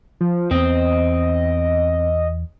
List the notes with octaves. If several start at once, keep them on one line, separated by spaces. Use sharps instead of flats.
F3
E2 B3 C4 D#5